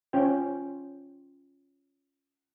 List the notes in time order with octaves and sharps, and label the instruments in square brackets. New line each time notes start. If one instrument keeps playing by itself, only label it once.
[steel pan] C#4 F4 C5 G5